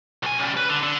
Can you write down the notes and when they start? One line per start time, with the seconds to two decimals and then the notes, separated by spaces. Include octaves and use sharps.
0.23 B1 G#5
0.40 C#3 G3
0.57 B4
0.69 D3
0.83 D3